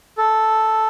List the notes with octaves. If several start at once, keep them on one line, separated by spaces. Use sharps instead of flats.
A4